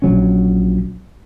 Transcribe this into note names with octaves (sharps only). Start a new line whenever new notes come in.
A#1 F#3 C#4